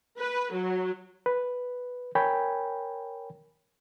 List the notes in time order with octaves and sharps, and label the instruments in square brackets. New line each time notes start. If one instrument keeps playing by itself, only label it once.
[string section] B4
F#3
[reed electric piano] B4
A#4 C#5 G5 G#5 B5